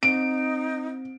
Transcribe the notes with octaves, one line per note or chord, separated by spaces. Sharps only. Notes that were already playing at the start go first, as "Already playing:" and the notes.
C4 D#4 D7